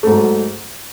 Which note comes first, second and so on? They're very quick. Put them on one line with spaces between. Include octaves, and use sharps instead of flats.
A3 G#2 F#3